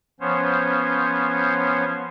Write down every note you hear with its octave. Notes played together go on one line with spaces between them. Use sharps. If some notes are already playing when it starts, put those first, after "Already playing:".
F3 B3 C#4 C5 C#5